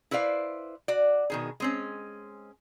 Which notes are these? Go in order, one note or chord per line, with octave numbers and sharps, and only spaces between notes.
E4 B4 C5 D5 F5
F#4 D5
B2 D#3 G#4
G#3 C4 C#4